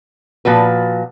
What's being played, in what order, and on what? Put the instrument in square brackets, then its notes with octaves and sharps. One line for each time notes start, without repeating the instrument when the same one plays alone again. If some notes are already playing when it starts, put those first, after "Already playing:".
[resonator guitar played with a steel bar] A#2 F3 F#4 B4